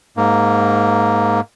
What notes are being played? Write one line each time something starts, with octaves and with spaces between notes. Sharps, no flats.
G#2 A#3